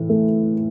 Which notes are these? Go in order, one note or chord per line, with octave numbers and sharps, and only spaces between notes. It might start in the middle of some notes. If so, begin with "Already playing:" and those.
Already playing: A2 E3
A3